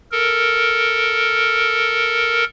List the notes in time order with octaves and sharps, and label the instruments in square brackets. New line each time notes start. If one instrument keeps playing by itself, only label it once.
[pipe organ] A4 A#4